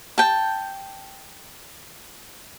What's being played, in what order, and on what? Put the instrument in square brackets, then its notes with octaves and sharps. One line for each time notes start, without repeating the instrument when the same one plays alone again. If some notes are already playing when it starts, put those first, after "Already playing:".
[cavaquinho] G5 A5